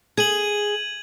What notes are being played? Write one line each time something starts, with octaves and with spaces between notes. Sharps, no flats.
G#4 G#6 D#7 F#7